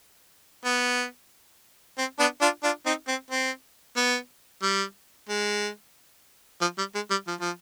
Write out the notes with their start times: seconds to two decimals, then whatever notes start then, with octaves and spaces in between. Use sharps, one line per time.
0.65 B3
1.98 C4
2.19 B3 D4
2.41 D4 F4
2.63 D4 F4
2.86 C4 D#4
3.08 C4
3.31 C4
3.96 B3
4.63 G3
5.29 G#3
6.61 F3
6.78 G3
6.95 G#3
7.11 G3
7.28 F3
7.40 F3